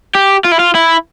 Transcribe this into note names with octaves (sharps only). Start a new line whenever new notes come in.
G4
F4
E4
F4
E4